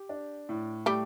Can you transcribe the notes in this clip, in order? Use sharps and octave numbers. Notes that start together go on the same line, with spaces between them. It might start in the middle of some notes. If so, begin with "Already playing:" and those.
Already playing: G4
D4
A2
G3 A3 G4